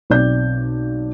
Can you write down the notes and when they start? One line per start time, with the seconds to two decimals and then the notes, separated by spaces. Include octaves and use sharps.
0.10 B1 C4 D5 G6